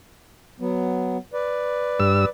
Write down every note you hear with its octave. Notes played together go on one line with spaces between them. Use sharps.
F#3 B3
B4 D5
G2 E6